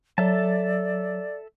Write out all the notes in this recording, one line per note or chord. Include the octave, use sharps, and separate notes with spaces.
F#3 A4 D5 E5 A5